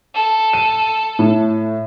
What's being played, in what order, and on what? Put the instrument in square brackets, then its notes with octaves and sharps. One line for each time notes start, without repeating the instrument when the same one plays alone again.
[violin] A4
[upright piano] D#7
A2